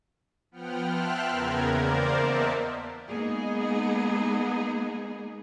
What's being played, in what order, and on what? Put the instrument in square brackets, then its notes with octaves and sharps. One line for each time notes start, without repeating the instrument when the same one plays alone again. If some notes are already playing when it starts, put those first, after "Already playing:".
[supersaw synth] F3 B3 F#5 G5 F6
E5 G5 A5 C6 F6 F#6
E2 C#3 B3 A#4 G#6
A#3 A#4 C5 D5
D#5 E5 F#5 A5
[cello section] G#3 A#3 B3 D#4 G#4